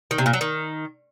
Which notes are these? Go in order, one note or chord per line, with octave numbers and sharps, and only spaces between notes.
D#3
C3
A#2
F#3
D#3